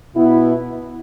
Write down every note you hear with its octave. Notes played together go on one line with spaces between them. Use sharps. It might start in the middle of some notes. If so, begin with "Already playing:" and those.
B2 B3 E4